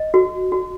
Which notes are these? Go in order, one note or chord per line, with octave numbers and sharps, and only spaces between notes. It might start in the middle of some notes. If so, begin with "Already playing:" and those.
Already playing: D#5
F#4
F#4